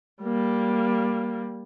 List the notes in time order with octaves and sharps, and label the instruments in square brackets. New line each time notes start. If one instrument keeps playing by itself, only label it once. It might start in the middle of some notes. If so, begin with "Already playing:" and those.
[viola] G3 A#3